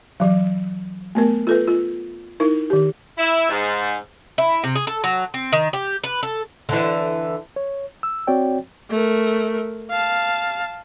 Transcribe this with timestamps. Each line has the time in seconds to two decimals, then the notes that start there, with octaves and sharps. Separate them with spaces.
0.20 E3 F#3
1.15 A3 B3 A#4
1.47 F4 A4 B4
1.68 F4
2.40 D#4 E4 A#4
2.70 D#3 G4
3.18 E4
3.50 G#2
4.38 E4
4.64 C3
4.75 G#4
4.87 A4
5.04 F#3
5.34 C4
5.53 D#3
5.73 G4
6.04 B4
6.23 A4
6.69 D3 E3
7.56 C#5
8.03 E6
8.27 C4 F#4 C#5 D5 G5
8.90 A3 A#4
9.90 F5 A5